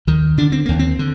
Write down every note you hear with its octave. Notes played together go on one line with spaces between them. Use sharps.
D#2 D#3
D3 D4
C4
D#2 A#3
C4
D3